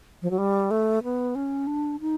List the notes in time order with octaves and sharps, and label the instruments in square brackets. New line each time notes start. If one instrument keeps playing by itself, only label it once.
[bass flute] F3
F#3
G3
A3
B3
C#4
D4
D#4